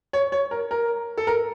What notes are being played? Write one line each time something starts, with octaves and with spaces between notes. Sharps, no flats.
C#5
C#5
A#4
A#4
A4
A#4